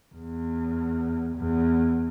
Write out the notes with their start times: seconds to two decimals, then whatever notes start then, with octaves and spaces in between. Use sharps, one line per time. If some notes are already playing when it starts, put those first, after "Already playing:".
0.15 E2
1.36 E2